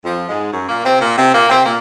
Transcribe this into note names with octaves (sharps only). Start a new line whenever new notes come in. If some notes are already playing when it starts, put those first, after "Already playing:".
F2 F3
G#2 G#3
F#2 F#3
A#2 A#3
C3 C4
A#2 A#3
C3 C4
A#2 A#3
C3 C4
A#2 A#3